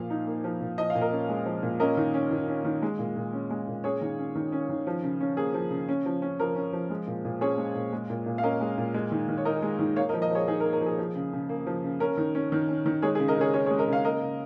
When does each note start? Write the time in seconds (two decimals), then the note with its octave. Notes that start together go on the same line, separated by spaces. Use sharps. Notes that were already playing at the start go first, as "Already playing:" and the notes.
Already playing: A#2 F3 F5
0.10 D#4
0.27 A#3
0.44 F3
0.61 A#2
0.78 F3 D#5
0.90 F5
0.95 A#2
1.01 A#4 D#5
1.12 C#4
1.29 G#3
1.45 F3
1.63 A#2
1.80 C#4 A#4 D#5
1.97 D#3
2.14 C#4
2.31 D#3
2.48 C#4
2.65 D#3
2.82 G#3
2.99 A#2
3.17 A#2
3.33 C#4
3.50 G#3
3.67 A#2
3.84 C#4 G#4 C#5
4.01 D#3
4.19 C#4
4.35 D#3
4.52 C#4
4.69 D#3
4.87 F3
5.03 C#3
5.21 C#4
5.37 A#3 G#4
5.54 F3
5.71 C#3
5.89 C#4
6.06 F3
6.22 C#4
6.40 F3 A#4
6.56 C#4
6.73 F3
6.90 G#3
7.07 A#2
7.25 A#2
7.41 C#4 G#4 C#5
7.58 G#3
7.75 A#2
7.93 G#3
8.10 A#2
8.26 A#2
8.38 F5
8.43 C#4 A#4 D#5
8.61 G#3
8.78 A#2
8.94 G#3
9.12 D#3
9.28 D#3
9.38 C#5
9.45 D#4 A#4 D#5
9.62 G#3
9.79 D#3
9.96 A#3 C#5 F5
10.09 A#4 D#5
10.14 F3
10.22 A#4 D#5
10.31 F3 G#4 C#5
10.48 D#4 G#4
10.60 A#4
10.64 A#3
10.73 A#4
10.81 F3 G#4
10.99 F3
11.15 C#3
11.33 C#3
11.49 A#3
11.67 F3
11.84 C#3
12.00 C#4 A#4
12.17 D#3
12.35 C#4
12.52 D#3
12.69 C#4
12.86 D#3
13.02 G#3 G#4 C#5
13.15 G#4
13.19 C#3
13.28 A#4 D#5
13.37 C#3 G#4 C#5
13.54 C#4 G#4 C#5
13.66 G#4 C#5
13.71 G#3
13.79 A#4 D#5
13.88 C#3 C#5 F5
14.05 A#3 A#4 D#5
14.22 C#3